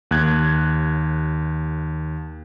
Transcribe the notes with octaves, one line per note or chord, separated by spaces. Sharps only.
D#2 F#6 G#6